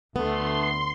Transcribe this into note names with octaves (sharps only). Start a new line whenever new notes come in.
D2 D3 A3 B3 C6